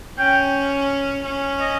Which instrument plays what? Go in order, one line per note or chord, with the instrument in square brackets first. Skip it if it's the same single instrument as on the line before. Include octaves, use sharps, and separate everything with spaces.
[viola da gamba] C#4 [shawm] G5
[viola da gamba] C#4
[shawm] D#5